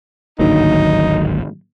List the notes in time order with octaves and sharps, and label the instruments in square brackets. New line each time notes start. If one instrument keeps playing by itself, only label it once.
[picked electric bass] D1 G#1 F#3 [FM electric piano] D3 D#3 A#3 [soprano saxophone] D#4